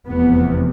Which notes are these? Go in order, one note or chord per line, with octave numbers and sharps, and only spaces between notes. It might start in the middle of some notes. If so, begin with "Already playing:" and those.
F1 E2 C3 B3